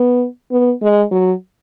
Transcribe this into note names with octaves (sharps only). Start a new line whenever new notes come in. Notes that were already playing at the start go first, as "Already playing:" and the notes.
Already playing: B3
B3
G#3
F#3